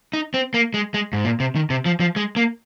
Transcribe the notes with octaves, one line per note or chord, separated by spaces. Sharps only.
D#4
C4
A#3
G#3
G#3
G#2
A#2
C3
D#3
C3
F3
F3
G#3
A#3